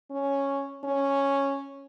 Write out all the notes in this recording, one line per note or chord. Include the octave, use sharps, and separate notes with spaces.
C#4
C#4